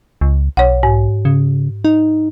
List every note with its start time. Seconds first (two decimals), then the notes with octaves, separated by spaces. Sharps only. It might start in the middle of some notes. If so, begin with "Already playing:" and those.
0.21 C#2
0.57 B1 C#5 F#5
0.83 G#2
1.25 C#3
1.85 D#4